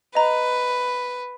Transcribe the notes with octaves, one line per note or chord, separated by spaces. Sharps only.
B4 D#5 A#5